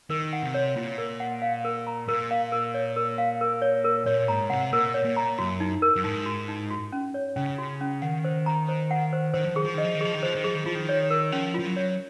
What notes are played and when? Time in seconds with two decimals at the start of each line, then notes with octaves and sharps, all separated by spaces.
0.10 D#3 A#4
0.33 F#5
0.43 C3
0.54 C#5
0.76 A#2 F4
0.98 A#4
1.20 F#5
1.42 F5
1.65 A#4
1.87 A#5
2.08 A#2 A#4
2.31 F5
2.52 A#4
2.74 C#5
2.96 A#4
3.18 F5
3.41 A#4
3.62 C#5
3.84 A#4
4.06 A#2 C#5
4.28 G#2 A#5
4.50 C3 F#5
4.72 A#2 A#4
4.94 C#5
5.05 A#2
5.17 A#5
5.38 F#2 F#4
5.60 D#4
5.82 A#4
5.96 F#2
6.04 G#2 D#4
6.26 F#4
6.48 D#4
6.71 F#4
6.92 C#4
7.14 C#5
7.36 C#3 C#4
7.58 F#4
7.81 C#4
8.02 D#3 F#5
8.25 C5
8.46 A#5
8.69 C5
8.91 F#5
9.13 C5
9.34 D#3 C5
9.44 F3
9.54 D#3 G#4
9.65 F3
9.74 D#3 D#5
9.85 F3
9.95 D#3
10.01 F3 G#4
10.14 D#3
10.23 F3 C5
10.35 D#3
10.44 F3 G#4
10.55 D#3
10.65 F3 F4
10.75 D#3
10.89 C#5
11.10 A#4
11.32 F3 C#4
11.54 F3 F4
11.66 F#3
11.76 C#5